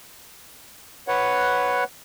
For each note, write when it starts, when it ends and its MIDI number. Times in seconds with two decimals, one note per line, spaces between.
1.08 1.84 71
1.08 1.84 73
1.08 1.84 78